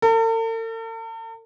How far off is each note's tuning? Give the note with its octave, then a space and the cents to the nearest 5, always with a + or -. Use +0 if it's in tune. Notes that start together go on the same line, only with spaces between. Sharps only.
A4 +45